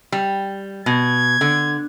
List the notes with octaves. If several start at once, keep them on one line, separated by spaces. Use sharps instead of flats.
G3
B2 G#6
D3